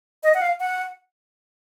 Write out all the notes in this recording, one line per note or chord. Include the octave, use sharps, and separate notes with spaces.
D#5
F#5
F5
F#5